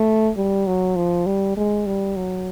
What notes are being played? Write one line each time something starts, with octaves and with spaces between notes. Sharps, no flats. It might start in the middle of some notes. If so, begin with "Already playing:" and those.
Already playing: A3
G3
F#3
F3
G3
G#3
G3
F#3